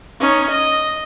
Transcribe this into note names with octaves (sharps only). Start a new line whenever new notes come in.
C#4 D#4
D#5